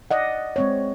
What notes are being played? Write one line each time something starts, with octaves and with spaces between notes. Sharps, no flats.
D5 D#5 F#5
G#3 C4 C#5